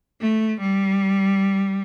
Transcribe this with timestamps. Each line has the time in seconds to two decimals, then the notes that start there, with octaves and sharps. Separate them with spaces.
0.21 A3
0.61 G3